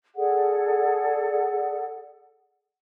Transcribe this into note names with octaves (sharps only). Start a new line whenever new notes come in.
G#4 A4 D5 F#5